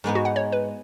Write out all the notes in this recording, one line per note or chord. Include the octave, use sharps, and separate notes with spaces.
G#2 G#3 B3 D#4
F#4
F#5
C#5
B4